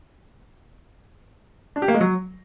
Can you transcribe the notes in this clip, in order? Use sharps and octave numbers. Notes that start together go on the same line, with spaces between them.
D4
G4
A#3
G#3
F#3